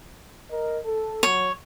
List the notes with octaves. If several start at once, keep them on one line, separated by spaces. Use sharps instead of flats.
A#4 D#5
A4
F#3 C#5